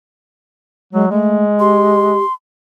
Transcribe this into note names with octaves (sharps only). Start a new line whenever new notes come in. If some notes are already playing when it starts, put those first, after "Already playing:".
F#3 G#3
G#3 A3
G4 C6